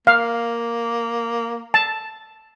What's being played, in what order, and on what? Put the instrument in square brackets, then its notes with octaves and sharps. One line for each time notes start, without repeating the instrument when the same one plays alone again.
[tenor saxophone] A#3 [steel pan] F5
[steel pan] A5